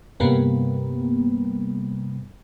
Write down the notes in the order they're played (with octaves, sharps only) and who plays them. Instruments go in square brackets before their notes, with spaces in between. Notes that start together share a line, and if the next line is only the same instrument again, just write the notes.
[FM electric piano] G2 C3 G3 A#3 B3